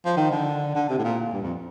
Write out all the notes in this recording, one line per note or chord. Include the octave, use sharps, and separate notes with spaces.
F3
D#3
D3
D3
C3
A2
A#2
G2
F2